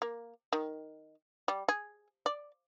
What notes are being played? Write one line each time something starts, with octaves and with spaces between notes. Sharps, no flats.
A#3
D#3
G3
G#4
D5